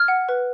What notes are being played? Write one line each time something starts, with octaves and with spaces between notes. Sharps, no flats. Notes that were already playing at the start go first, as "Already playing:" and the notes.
Already playing: F6 G#6
F#5
B4